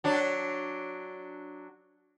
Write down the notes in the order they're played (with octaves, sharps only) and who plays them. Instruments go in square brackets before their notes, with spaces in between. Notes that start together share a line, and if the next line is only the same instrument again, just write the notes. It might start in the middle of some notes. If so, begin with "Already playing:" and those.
[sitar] F#3 D4